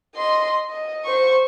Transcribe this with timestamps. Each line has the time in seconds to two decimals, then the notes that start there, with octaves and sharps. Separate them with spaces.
0.15 D#5 C6
0.70 D#5
1.05 C5 C#6